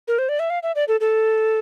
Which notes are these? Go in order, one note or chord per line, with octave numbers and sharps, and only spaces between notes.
A#4
C5
D5
E5
F5
E5
D5
A4
A4